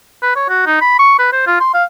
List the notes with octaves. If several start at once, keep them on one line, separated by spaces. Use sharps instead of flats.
B4
C#5
F#4
D#4
B5
C#6
B4
C5
F4
C6
F5